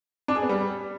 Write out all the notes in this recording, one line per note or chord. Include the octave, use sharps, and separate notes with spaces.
D4
G#4
B3
G3